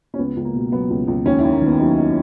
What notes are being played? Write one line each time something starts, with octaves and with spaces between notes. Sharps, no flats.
C#4
C#2 B3
C#2
A#3
B2
F#3 B3
C#2
C#2
D#2 C#4
D#2 E4
A#3
D#3 B3
F#3 D#4
D#4